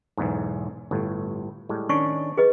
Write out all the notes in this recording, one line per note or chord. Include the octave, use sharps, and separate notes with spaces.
B1 E2 G#2
G1 A2
A2 G3 G#3
D#3 C#4 D4 C#6
G#4 B4 D#5